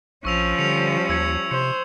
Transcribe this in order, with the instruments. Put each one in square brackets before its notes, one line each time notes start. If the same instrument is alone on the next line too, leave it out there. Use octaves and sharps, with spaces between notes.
[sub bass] A#1 [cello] F3 C#4 [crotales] C#6 E6 F7
[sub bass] D3 [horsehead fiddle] G3 [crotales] C#7 F7
[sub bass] D#2 [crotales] E6 G#6 C#7
[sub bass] C3 [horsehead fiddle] C5 [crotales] C#7